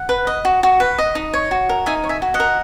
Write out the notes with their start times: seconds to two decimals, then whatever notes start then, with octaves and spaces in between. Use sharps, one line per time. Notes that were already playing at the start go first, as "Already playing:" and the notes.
Already playing: F#5
0.09 B4
0.27 D#5
0.45 F#4
0.63 F#4
0.80 B4
0.98 D#5
1.15 D#4
1.34 C#5
1.51 F#4
1.69 A#4
1.86 D#4 E5 G#5
2.04 C#5
2.09 E5 G#5
2.22 F#4
2.34 D#5 F#5
2.40 A#4